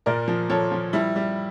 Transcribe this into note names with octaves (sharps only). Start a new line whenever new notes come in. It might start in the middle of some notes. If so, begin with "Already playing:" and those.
A#2 A#4 D5
F3
F3 A4 C#5
F3
G3 E4
G3